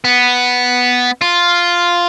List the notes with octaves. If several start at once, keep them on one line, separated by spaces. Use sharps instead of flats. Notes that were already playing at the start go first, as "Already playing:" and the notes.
B3
F4